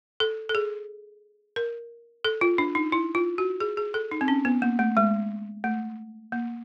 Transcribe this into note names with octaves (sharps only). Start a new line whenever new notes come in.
A4
A4
G#4
A#4
A4
F4
D4
D#4
E4
F4
F#4
G#4
G#4
A4
D#4
C4
C#4
B3
A#3
A3
G#3
A3
A#3